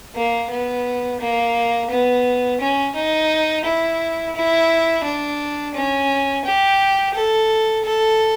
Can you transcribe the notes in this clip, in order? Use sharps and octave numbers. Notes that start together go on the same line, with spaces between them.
A#3
B3
A#3
B3
C#4
D#4
E4
E4
D4
C#4
G4
A4
A4